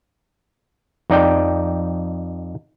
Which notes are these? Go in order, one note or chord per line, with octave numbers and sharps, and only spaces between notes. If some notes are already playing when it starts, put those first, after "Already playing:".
F2 D#4 D5 G5